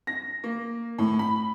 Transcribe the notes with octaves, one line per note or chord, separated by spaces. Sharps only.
A#6
A#3
A2
B5